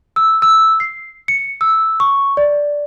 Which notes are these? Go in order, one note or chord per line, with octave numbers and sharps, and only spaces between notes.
E6
E6
C7
C#7
E6
C#6
D5